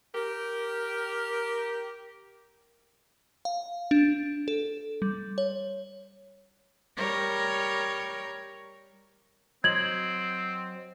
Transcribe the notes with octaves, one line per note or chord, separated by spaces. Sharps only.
G4 A#4
F5
D4
A4
G3
C#5
G3 A#4 C#5
F#3 C4 C5 D#5 G#6 F#7